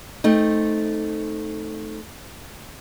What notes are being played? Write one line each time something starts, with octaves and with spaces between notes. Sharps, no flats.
A3 C4 D#4